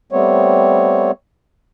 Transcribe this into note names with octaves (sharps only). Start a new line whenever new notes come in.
G3 A3 B3 C4 C#5